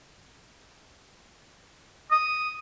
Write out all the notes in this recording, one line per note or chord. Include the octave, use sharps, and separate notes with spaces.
D#6